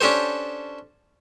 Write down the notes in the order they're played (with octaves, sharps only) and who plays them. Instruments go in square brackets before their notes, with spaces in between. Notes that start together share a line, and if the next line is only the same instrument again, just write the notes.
[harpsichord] C#4 D4 G4 A4 C5